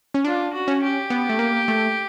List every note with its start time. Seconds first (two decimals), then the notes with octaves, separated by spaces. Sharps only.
0.14 C#4
0.24 D4 F4
0.53 F#4
0.68 C#4
0.81 G4
1.10 B3
1.29 A3
1.39 A#3
1.68 A3